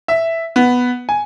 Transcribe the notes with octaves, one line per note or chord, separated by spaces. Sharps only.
E5
B3
G#5